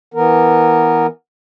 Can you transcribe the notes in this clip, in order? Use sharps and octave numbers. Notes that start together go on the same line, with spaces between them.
E3 B3 A#4